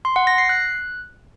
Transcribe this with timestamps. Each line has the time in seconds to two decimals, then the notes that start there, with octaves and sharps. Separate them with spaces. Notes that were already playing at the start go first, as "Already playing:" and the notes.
0.05 C6
0.16 F#5
0.27 A#6
0.38 C7
0.49 F#6